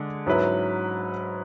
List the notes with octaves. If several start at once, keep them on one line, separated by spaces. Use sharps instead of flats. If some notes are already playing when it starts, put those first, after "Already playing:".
Already playing: D3 G#3
G#2 F#3 C#4 E4 B4